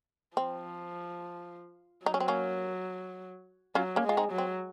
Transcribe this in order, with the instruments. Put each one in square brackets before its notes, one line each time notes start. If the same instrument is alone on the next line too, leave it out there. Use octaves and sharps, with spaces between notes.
[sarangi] F3 [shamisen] C4
[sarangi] F#3 [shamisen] D#4
[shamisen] C#4
C4
A#3 C#4
[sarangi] F#3 [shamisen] C#4 F4
[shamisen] A#3 C#4
[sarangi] G#3
[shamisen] F4
C4 D#4
[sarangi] F#3
[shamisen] C4